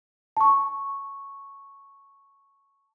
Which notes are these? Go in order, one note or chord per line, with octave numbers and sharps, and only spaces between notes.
A5 C#6